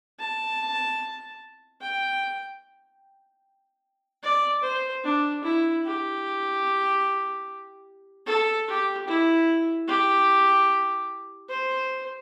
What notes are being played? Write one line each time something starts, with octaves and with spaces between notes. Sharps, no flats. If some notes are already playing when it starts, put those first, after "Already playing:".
A5
G5
D5
C5
D4
E4
G4
A4
G4
E4
G4
C5